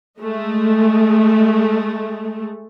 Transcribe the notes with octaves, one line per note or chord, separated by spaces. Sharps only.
G#3 A3